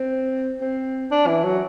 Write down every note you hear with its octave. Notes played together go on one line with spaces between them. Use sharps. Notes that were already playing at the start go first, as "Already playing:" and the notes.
Already playing: C4
C4
D4
E3
F#3